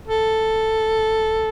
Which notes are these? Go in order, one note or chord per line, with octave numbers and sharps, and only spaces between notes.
A4